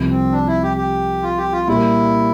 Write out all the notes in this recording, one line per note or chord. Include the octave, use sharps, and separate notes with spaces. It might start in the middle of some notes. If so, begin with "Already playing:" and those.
Already playing: C2 C3 F3
C4
D4
E4
G4
G4
F4
G4
F4
A#2 G3 A#3 E4